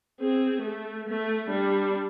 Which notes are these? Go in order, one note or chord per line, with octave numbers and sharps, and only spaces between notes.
C4 G#4
A3
A3
G3 D4